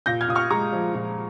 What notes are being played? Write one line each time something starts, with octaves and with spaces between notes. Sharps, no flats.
A#2 G6 A#6
F6 G#6
A#2 D#6
C#6 F6
G#3 A#5 C#6
F3
A#2